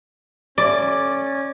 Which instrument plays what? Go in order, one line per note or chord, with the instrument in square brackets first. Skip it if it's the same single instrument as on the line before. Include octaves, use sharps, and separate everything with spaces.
[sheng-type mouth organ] C#4 [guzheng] D5